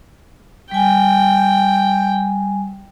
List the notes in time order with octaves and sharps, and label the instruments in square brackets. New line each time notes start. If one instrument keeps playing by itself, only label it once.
[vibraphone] G3 G#5 [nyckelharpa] G5